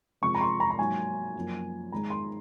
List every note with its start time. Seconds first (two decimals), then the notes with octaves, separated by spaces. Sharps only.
0.22 C3 F3 G#3 C#6
0.35 A#5
0.41 C6
0.60 A#5
0.70 A#5
0.78 G#2 F#3 A#3 G#5
1.35 F#2 F3 A#3
1.91 G#2 D#3 G#3 A#5
2.10 C6